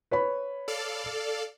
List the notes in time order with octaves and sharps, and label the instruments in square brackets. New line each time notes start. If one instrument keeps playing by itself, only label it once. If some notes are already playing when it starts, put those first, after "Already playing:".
[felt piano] B4 C#5 B5
[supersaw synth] A4 D5 F5